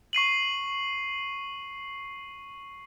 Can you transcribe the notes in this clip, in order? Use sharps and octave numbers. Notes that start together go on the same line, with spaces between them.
C#6 C7 D#7 F#7